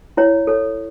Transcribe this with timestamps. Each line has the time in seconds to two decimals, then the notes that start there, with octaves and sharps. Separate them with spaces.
0.17 E4 C#5
0.47 A4 C#5